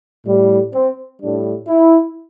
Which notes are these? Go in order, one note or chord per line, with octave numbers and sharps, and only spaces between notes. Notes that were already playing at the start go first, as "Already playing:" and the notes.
A2 G3
C4
A2 G3 D4
E4